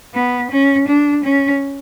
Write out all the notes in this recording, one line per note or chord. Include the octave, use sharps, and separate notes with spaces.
B3
C#4
D4
C#4